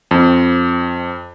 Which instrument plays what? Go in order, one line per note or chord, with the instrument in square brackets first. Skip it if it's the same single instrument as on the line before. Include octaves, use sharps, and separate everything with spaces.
[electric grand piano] F2